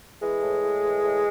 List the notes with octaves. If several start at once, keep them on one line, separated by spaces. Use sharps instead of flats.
E3 G#3
A2
A2
E3
A2